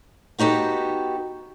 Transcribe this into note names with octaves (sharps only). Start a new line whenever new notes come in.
B3 D#4 F#4 G4 A4